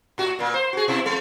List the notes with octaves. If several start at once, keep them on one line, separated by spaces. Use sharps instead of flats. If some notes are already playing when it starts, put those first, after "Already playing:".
A2 F#4
A#2 A#3
C5
F#4 G#4
B2 E4
F2 G#3